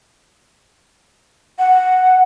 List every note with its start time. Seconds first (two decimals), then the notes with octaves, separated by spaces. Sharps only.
1.59 F#5